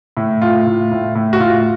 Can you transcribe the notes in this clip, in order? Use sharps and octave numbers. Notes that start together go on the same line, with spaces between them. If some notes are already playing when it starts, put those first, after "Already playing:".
A2
A2 F4
A2
A2
A2
F#4
A2 F4